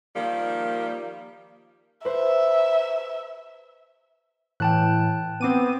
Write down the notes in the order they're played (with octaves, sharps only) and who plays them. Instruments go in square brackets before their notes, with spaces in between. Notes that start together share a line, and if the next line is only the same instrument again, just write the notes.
[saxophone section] D#3 F3 G3 A#3
[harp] B4 C5 [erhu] E5
[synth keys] A2 E3 [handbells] G5 A5 F#6
[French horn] B3 [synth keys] C4 D6 D#7